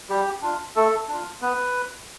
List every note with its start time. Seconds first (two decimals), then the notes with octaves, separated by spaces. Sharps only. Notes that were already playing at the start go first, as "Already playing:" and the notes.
0.09 G3 G4
0.42 D4 F4
0.75 A3 A4
1.08 D4 F4
1.41 B3 B4